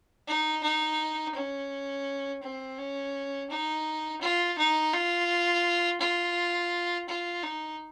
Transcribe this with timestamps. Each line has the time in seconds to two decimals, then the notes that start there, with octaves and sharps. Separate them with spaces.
0.27 D#4
0.63 D#4
1.35 C#4
2.43 C4
2.78 C#4
3.50 D#4
4.21 F4
4.58 D#4
4.93 F4
6.00 F4
7.09 F4
7.43 D#4